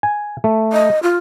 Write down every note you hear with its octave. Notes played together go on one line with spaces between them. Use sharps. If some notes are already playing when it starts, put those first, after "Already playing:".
G#5
A3
D#5
F4